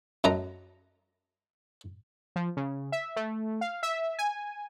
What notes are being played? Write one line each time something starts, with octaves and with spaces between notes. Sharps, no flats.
F#2 A3 D#5 A#5
F3
C#3
E5
A3
F5
E5
G#5